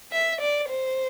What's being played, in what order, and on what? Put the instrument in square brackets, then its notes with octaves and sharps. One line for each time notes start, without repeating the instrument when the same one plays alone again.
[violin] E5
D5
C5